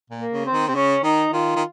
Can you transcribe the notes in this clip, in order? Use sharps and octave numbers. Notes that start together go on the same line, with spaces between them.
A#2
A#3
C#3
C4
D#3
C3 C4
C#3 C#4
D#3 D#4
D#3 F4
D#3